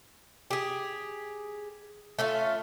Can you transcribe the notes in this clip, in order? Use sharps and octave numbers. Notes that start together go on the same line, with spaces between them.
G4 G#4
A3 C#4 F4